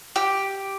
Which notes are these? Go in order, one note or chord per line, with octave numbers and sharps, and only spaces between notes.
G4